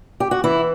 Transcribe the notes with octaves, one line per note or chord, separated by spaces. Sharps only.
G4
F#4
E3 E4